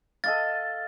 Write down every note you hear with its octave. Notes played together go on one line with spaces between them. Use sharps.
A4 D#5 F5 A6